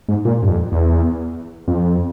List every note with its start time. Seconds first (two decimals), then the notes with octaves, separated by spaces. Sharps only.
0.09 G#2
0.25 A#2
0.43 G2
0.49 F2
0.72 E2
1.68 F2